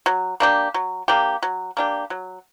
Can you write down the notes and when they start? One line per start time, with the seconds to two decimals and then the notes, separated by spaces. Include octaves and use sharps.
0.06 F#3
0.40 A#3 D4 G4
0.74 F#3
1.08 A#3 D4 G4
1.43 F#3
1.77 A#3 D4 G4
2.10 F#3